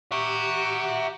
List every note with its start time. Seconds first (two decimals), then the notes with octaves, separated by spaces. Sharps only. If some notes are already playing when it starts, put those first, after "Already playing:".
0.12 F#4 G4 E5 A#5